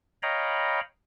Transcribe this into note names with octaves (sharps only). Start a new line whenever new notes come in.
C#5 D#5 F5 G5 A#5 B5